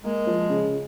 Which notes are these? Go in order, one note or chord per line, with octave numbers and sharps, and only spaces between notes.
G#3 A#3
F3
C#3